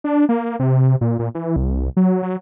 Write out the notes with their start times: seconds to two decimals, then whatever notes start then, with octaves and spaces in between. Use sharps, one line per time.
0.04 D4
0.29 A#3
0.59 C3
1.01 A#2
1.19 A#2
1.35 E3
1.56 C2
1.97 F#3
2.23 F#3